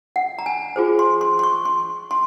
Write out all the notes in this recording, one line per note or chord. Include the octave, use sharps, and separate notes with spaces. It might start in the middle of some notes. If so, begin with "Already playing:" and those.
F#5
A#5
G#5
F4 G#4 C5
C6
C6
C6
C#6
C6
C6